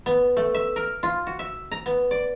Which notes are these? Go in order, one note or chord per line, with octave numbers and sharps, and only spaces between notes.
B3
A3
E5
A#4
F4
F#4
E5
A#5
B3
D5